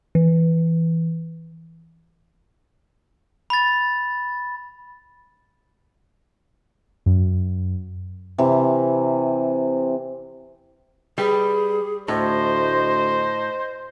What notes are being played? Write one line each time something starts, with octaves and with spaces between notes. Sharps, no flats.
E3
B5 A6
F#2
C3 E3
G3 G4 G#4 B4
D2 A2 C5 D#5